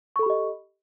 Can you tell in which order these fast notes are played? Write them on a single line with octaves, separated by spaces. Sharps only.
C#6 A4 B5 G4 D#5